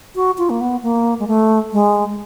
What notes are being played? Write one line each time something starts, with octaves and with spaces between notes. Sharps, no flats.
F#4
F4
A#3
B3
A#3
G#3
A3
G#3